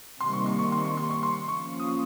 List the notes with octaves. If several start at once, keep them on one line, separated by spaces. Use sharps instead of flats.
C3 D#3 G3 A#3 C6
C#6
C6
C#6
C6
C#6
C6
C#6
C6
F3 A#3 C#4 F4 C#6
D#6